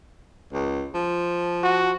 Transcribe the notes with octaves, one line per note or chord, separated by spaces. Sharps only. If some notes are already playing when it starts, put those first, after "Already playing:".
C#2
F3
F#4